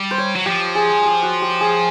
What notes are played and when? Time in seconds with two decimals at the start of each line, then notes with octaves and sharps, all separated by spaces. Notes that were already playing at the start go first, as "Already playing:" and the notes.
Already playing: G3
0.11 C5
0.18 C#5
0.35 F#3
0.46 F3 G4
0.75 G#4
1.04 G4
1.23 F#4
1.42 G4
1.61 G#4